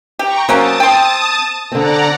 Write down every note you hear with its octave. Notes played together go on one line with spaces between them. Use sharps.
G4 G5 A#5 C#6
F#3 A#3 C4 C#4 A5 D#6
G5 C6
D3 C4 D5 F#5 A#5